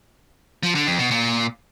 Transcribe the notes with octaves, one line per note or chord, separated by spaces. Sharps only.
F3
D3
F2
B2
A#2